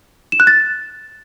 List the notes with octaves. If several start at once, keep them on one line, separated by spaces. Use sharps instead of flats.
E7
F#6
A6